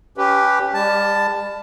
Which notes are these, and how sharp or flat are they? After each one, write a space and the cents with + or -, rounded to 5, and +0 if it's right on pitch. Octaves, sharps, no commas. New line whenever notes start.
C#4 +25 G4 +0 B4 +0
G3 +40 A5 +0